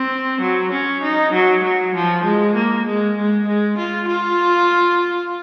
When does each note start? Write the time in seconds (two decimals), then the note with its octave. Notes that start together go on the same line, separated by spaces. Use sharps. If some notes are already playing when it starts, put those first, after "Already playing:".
Already playing: C4
0.41 F#3
0.72 C#4
1.03 D#4
1.33 F#3
1.64 F#3
1.95 F3
2.25 G#3
2.55 A#3
2.86 G#3
3.17 G#3
3.47 G#3
3.78 F4
4.08 F4